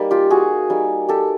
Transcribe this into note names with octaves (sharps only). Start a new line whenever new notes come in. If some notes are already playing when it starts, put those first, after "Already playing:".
Already playing: G3 A#3 D#4
F4 G4
F#4 G#4
G3 A#3 D#4
G4 A4